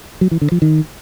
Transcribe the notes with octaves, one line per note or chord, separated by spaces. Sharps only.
F#3
E3
D3
F3
D#3